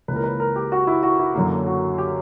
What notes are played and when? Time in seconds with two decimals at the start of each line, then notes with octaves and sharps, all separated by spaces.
0.08 C#2 C#3 E3 A#3 B4
0.16 A#4
0.24 B4
0.40 A#4
0.56 G4
0.72 F#4
0.87 E4
1.03 F#4
1.19 E4
1.35 F#2 D3 F#3 A#3
1.66 F#4
1.98 G4